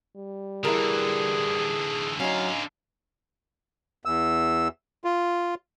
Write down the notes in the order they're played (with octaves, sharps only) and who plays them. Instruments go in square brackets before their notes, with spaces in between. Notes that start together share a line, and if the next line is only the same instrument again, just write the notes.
[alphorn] G3
[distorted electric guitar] D3 E3 [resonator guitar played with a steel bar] E4 A#4 [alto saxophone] G#4
[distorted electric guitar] D3 F5 [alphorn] F#3 [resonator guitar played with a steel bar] C#4 D#4
[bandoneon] E2 E6
F4